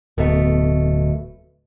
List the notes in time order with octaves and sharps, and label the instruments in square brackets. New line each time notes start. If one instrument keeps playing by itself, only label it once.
[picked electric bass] D1 [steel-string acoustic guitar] B2 A3